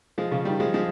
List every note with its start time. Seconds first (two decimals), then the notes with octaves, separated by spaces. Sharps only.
0.18 F3 G#3
0.31 C#3 F3
0.45 D#3 G3
0.60 F3 G#3
0.74 F3 G#3